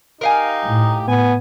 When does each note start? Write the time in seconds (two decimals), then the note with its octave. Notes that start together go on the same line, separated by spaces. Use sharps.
0.21 D#4 G4 A#4 F5 G#5
0.65 A2
1.08 B3 G#5